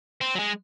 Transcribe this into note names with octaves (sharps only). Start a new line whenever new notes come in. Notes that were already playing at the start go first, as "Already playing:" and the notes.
C4
F#3
G#3